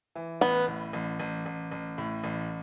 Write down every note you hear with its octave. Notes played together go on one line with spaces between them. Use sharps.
E3
A1 B3
A2
A1
A1
A1
A1
A2
A1